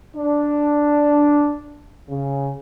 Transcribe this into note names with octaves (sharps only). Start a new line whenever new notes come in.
D4
C#3